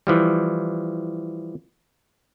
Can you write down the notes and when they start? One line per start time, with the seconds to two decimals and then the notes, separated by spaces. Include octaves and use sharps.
0.07 E3 F3 G3